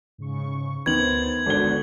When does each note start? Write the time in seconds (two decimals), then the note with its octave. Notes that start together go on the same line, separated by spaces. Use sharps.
0.18 G#2 C#3 C#6
0.86 D2 D#3 B3 C5 G#6 A6 F#7
1.46 G#1 D3 B3 F#4 A#4 G7